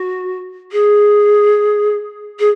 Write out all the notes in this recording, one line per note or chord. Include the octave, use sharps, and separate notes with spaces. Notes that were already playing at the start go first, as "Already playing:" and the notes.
Already playing: F#4
G#4
G#4